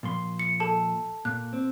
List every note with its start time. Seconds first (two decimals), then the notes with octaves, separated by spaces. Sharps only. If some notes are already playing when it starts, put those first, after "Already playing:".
0.03 A#2 F3 C6
0.39 C#7
0.60 A4 A5
1.25 A#2 F#6
1.53 C4